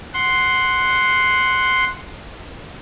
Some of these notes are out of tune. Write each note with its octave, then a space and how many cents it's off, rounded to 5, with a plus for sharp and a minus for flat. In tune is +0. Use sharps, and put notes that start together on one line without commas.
F#5 +0 C6 +0